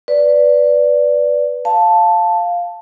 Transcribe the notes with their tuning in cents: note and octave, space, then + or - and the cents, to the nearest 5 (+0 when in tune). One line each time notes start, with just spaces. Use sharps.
B4 +0 D5 -10
F5 +0 A5 +0